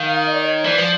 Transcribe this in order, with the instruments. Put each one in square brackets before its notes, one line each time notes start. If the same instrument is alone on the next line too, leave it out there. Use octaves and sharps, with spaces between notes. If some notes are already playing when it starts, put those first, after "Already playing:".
Already playing: [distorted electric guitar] D#3 [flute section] F5
[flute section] D#5
D5
C#5 D#5
[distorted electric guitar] E3 [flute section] C5 D5
[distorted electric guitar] F3